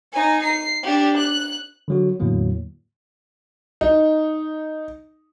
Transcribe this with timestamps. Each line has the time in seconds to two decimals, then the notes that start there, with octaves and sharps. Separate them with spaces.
0.13 D#4 G#5
0.44 C7
0.83 D4 G4
1.18 F#6
1.88 D3 F#3 F#4
2.20 E2 A2 D3 F#3 A#3
3.81 D#4